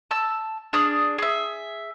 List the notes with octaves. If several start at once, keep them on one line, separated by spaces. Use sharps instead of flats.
A5 E6
D4 G#4 D#6 F6
G#4 E5